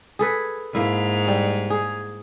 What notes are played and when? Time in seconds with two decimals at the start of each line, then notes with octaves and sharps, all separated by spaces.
0.19 G#4 A4 B4
0.75 G#2 A#3 E4
1.28 G3
1.70 G#4